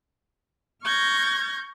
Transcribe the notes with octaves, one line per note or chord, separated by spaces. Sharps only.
C#6 F6 G6 G#6 A#6